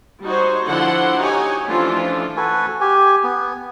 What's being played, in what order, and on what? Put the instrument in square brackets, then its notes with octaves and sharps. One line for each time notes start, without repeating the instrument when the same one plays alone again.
[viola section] G3 D#4 F#4 C5 C#5
D3 F3 E4 F#4 F#5 C6
D#4 F#4 G4 C#5 G#5
E3 F3 A3 C#4 D4 F4
[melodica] F#4 A4 B4 G#5
G4 G#5
B3